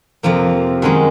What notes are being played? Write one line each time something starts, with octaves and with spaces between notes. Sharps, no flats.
F2 C3 F3 A#3
F#2 D#3 G#3